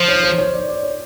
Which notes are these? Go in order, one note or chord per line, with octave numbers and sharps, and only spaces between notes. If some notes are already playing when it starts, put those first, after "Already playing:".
Already playing: F3 C5
C#5
C5
C#5
D5
D5
C#5